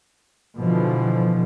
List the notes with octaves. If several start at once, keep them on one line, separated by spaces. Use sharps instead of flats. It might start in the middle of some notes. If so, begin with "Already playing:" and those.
B2 D3 E3 F3